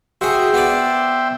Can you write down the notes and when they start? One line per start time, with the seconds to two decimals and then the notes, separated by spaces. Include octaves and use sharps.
0.21 F#4 G#4 C5 E5 G5
0.54 B3 D4 D5